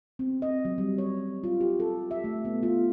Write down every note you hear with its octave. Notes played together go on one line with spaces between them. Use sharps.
C4
D#5
F#3
G3
C#5
F4
G4
A4
E5
A3
B3
F4